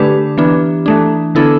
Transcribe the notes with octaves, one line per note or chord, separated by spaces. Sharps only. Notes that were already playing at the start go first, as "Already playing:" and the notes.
Already playing: D3 A3 D4 G4 B4
E3 B3 D4
E3 A3 D4
D3 B3 D4 E4 A4